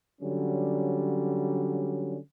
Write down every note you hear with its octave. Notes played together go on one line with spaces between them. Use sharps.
D3 F#3 G3 C#4